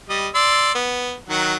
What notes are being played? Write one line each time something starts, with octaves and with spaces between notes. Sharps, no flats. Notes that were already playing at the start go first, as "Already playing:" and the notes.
G3 D#5
D5 C6 E6
B3
D#3 F#3 F#5